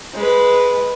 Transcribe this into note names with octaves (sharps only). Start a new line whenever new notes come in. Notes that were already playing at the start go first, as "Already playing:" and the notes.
G#3 B4